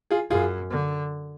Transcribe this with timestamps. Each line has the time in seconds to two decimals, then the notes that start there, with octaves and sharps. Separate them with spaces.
0.10 F4 G#4
0.30 F#2 F4 G#4
0.70 D3